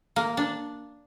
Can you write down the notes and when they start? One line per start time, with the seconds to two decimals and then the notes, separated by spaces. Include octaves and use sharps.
0.16 A#3
0.37 D4